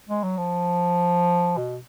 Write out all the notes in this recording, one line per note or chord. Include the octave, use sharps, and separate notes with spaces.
G#3
F#3
F3
B2